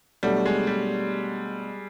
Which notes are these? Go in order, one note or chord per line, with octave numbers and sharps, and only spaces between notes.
B2 F#3 G3 A3 D4
G#3
G3